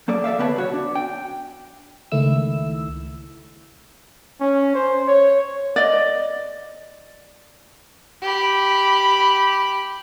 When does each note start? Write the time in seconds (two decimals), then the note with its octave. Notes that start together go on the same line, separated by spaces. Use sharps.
0.08 F#3 A#3 A4 D5
0.24 A4 D5 E5 F5
0.38 D3 B3 G4 B4 C#5 A5
0.56 B1 F#4 C#5
0.74 D4
0.95 G5
2.12 C#2 D#3 A3 E4 E6
4.41 C#4
4.76 C5
5.08 C#5
5.76 D5 D#5
8.22 G4 B5